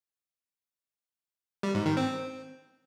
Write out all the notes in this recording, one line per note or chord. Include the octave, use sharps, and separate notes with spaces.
G3
G#2
D#3
C4